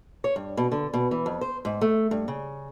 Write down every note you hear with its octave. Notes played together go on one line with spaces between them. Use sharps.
C#5
G2
B2
D3
B2
E3
F2
C5
G#2
A3
G2
C#3